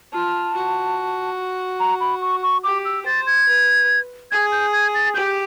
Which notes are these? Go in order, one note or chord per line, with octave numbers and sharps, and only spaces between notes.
F4 A5
F#4
A#5
B5
C#6
C#6
G4 D6
E6
C5 A6
G#6
B4
G#4 G#6
G6
G#6
A6
G4 G6